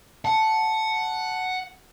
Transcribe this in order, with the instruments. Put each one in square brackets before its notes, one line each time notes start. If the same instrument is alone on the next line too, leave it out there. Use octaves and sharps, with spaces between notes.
[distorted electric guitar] F#5 [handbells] A5